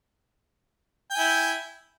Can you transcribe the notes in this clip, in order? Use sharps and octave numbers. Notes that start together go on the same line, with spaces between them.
E4 G5 G#5